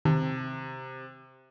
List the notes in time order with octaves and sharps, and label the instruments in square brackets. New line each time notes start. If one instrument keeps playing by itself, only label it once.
[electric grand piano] C3 [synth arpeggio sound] D#3